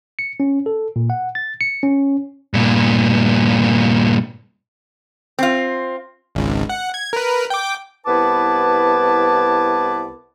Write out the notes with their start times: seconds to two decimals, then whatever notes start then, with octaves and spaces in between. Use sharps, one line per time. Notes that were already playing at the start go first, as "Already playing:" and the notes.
0.19 C#7
0.40 C#4
0.66 A4
0.96 A#2
1.10 F#5
1.35 A6
1.61 C#7
1.83 C#4
2.54 G2 A#2
5.39 C4 F4
6.35 G#1 C#2
6.69 F#5
6.94 G#6
7.13 A#4 B4
7.50 G5 D6
8.06 C2 B3 E4 B4 A5 D6